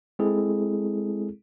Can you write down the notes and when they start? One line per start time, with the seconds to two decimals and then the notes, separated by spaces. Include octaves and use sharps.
0.19 G#3 C4 E4 G#4 A4